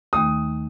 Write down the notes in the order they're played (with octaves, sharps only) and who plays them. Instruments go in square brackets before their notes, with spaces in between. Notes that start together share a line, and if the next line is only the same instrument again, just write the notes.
[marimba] D#2 D#3 A3 [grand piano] D#6